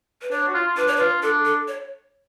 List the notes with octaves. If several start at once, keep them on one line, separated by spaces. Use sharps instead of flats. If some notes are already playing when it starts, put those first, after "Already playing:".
B4
D4 C#5
F#4
F4
F4
D4 B4
C#5
B4
F4
D4 A4
A4
C#5